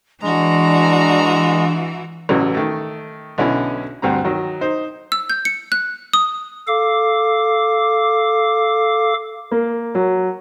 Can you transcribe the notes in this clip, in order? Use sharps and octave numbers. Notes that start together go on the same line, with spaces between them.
E3 G#3 D4 F#4 A#5
A1 C#3 E3 F#3
D#3 A3
B1 D3 C#4 E4
D2 G2 C4 A#5
D#3 F#3
D#4 C5
E6
G6
C#7
F#6
D#6
A4 F5 D6
A#3
F#3